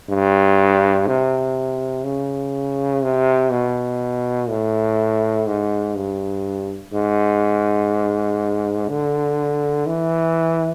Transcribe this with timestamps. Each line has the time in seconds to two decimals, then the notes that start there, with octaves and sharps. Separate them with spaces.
0.09 G2
1.07 C3
2.04 C#3
3.02 C3
3.51 B2
4.49 A2
5.46 G#2
5.95 G2
6.93 G#2
8.88 D3
9.86 E3